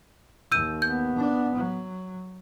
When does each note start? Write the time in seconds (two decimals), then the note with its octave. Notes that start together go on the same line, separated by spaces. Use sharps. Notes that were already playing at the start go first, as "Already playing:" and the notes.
0.52 D#2 E6 G6 D#7
0.82 B3 G6
1.17 D4
1.55 F#3